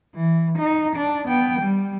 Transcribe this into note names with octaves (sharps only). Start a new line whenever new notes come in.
E3
D#4
D4
B3 G5
G3